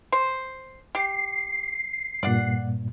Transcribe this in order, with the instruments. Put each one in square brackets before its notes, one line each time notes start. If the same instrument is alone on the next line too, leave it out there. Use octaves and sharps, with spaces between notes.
[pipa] C5
[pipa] G4 [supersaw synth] C7
[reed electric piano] G2 A#2 [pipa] D5 F#5